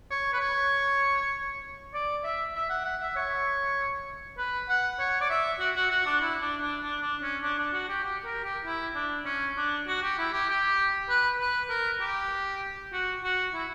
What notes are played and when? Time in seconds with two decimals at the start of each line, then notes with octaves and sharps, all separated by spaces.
0.10 C#5
0.33 B4
0.40 C#5
1.94 D5
2.24 E5
2.55 E5
2.70 F#5
2.84 F#5
3.01 E5
3.16 C#5
4.38 B4
4.69 F#5
4.99 C#5
5.21 D5
5.30 E5
5.60 F#4
5.76 F#4
5.91 F#4
6.06 D4
6.21 E4
6.41 D4
6.61 D4
6.82 D4
7.02 D4
7.22 C#4
7.43 D4
7.59 D4
7.73 F#4
7.89 G4
8.04 G4
8.25 A#4
8.44 G4
8.65 E4
8.95 D4
9.25 C#4
9.57 D4
9.87 F#4
10.03 G4
10.18 E4
10.33 G4
10.49 G4
11.09 B4
11.40 B4
11.70 A#4
12.01 G4
12.92 F#4
13.23 F#4
13.54 E4